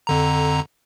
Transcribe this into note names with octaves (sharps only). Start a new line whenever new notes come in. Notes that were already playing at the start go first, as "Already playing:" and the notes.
F2 D3 A#5